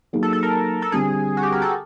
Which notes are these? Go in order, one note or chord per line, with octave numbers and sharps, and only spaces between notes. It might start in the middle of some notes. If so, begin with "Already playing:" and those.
F#3 A#3 D#4 G#4
A4
A4
A#4
A4
D3 G3 C4 G#4
F#4
G4
A#4
A4